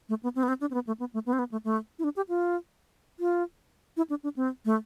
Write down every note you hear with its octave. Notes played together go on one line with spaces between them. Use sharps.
A3
B3
C4
B3
C4
D4
C4
B3
A3
B3
A3
B3
C4
B3
A3
A3
E4
D4
G4
F4
F4
E4
D4
D4
C4
A3